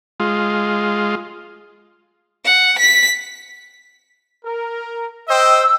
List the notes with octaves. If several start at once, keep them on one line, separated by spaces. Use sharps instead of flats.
G#3 F4
F#5
B6
A#4
C5 D#5 G5 E6